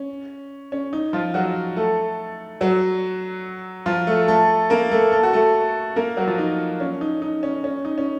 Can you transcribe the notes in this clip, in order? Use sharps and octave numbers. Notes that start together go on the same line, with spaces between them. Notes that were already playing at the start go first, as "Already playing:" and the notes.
Already playing: C#4
C#4
D#4
F3 F4
F#3 F#4
A3 A4
F#3 F#4
F3 F4
A3 A4
A3 A4
A#3 A#4
A3 A4
A4
F#4
A3 A4
A#3 A#4
F#3 F#4
F3 F4
D#4
C#4
D#4
D#4
C#4
C#4
D#4
C#4